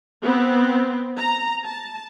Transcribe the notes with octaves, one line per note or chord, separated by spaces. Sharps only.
B3 C4
A#5
A5